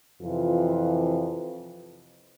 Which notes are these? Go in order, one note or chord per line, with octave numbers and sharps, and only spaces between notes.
F2 C3 E3 F4